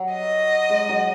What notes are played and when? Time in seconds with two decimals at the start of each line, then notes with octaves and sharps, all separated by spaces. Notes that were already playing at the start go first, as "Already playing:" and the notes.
Already playing: F#3
0.12 D#5
0.70 G#3
0.89 F#3